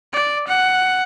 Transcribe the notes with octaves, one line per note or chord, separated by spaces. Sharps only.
D5
F#5